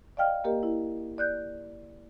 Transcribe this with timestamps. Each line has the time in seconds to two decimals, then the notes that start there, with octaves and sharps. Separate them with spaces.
0.17 D5 D#5 F5 G5 F6
0.44 A#3 G4 A#4 D#5
0.63 E4
1.18 D5 F#6 G6